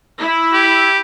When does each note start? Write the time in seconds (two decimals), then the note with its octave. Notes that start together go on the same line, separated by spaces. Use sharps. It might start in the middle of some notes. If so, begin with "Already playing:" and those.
0.19 E4
0.53 G4